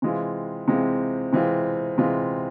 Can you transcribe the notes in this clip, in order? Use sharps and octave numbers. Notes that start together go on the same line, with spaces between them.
C3 E3 G#3 C4 F4
C3 E3 G#3 C4 F4
C3 E3 G#3 C4 F4
C3 E3 G#3 C4 F4